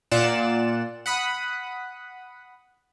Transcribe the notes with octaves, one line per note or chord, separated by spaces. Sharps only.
A#2 F4 D5 F#5 E7
F#5 B5 D#6